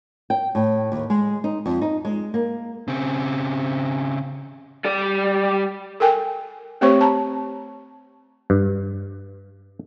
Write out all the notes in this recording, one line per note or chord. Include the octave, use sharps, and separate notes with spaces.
G5
A2
D#2
G#3
D#4
F2
D#4
G#3
A#3
C#3 C4
G3 D5
A4 A#4 G5 G#5
A3 C4 G4 C5 C#5 C#6
A5 A#5
G2